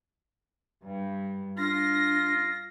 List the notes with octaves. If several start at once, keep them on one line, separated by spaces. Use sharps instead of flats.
G2
D4 F4 A#6